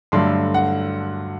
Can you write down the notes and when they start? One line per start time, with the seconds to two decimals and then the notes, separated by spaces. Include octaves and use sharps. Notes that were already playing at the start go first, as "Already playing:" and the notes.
0.12 G2 D3 F#3 A3 C6
0.54 F#5